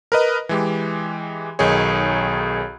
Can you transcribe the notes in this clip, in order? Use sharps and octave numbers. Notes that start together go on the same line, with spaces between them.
A#4 B4 D#5
E3 G#3 G4
B1 D#3 D#4 G#4 C#5